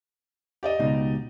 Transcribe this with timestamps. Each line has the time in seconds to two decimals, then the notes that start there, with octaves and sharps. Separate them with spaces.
0.63 G4 D5 D#5
0.80 C#2 B2 D#4